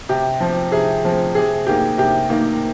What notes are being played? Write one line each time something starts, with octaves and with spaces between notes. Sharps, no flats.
C3 G4
F3 C4
C3 G#4
F3 C4
C3 G#4
D#3 A#3 G4
C3 G4
D#3 A#3